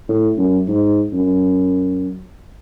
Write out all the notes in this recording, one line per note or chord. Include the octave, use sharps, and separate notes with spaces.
A2
F#2
G#2
F#2